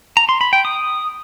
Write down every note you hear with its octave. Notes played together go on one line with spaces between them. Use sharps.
A#5
C6
B5
G5
D#6